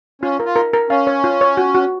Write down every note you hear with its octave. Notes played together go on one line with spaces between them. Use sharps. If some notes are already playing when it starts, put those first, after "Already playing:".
C#4 F4
A#4
F4
A#4
A#4
C#4 F5
C#5
F4
C#5
F#4
F#4